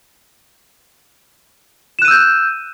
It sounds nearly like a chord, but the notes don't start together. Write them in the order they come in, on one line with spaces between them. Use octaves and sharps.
E7 F#6 D#7 E6 G6